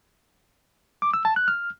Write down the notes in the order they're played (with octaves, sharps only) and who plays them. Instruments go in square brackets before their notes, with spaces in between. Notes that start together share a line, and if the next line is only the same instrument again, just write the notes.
[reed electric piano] D6
E6
A5
F#6
F6